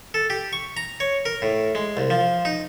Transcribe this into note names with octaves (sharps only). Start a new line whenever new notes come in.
A4
G4
C#6
A#5
C#5
A#4
A2
G#3
C2
F3
D#4